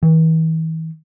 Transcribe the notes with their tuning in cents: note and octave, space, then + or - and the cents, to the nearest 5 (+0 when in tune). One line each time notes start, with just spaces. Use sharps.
E3 -40